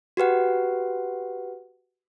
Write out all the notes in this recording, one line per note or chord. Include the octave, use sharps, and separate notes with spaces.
F#4 G4 B4 F#5